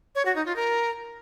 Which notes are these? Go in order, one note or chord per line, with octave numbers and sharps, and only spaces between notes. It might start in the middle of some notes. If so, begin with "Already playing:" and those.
C#5
F#4
D#4
F4
A#4